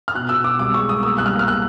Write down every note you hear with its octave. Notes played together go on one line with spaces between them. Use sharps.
F6
B2 F#6
B2 E6
B2 D6
C2 D6
G#3 C#6
B2 D#6
A#3 E6
C2 F#6
F6
A#3
F6
A#3 F#6